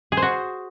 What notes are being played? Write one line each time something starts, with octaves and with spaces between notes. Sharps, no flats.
G#4
C5
F#4